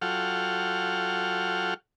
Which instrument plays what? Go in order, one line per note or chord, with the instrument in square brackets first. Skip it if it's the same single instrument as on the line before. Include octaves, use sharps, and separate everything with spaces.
[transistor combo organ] F#3 F4 A4 F#5 G5 F6